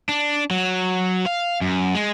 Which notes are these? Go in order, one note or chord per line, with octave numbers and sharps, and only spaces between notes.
D4
F#3
F5
F#2
G#3